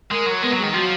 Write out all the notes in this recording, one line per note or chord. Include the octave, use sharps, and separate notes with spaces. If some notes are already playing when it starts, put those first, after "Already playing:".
G#3 A#4
F#3
G#3 B3
F#3 G#3
D#3
F3 F#3